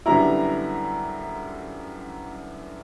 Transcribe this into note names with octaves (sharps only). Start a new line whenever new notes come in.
F#2 D3 G3 B3 E4 A#5